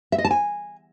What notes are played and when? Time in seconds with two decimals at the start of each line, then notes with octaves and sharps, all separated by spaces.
0.12 E5
0.18 D#5
0.25 A5
0.31 G#5